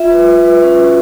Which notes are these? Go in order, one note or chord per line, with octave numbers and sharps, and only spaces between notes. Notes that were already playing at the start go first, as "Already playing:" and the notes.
Already playing: F4 E5
B4
B4
B4
C#4
F#4